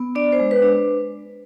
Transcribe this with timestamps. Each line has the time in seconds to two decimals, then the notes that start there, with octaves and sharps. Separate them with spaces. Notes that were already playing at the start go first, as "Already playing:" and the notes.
Already playing: B3
0.15 D4 D5
0.33 C5
0.40 G#3
0.51 B4
0.62 D4